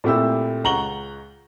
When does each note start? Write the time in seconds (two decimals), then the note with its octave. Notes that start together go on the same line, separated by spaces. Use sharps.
0.04 A#2 A3 C4 E4 G4 E6
0.64 C#2 F#5 A#5 C#6 F#7 G7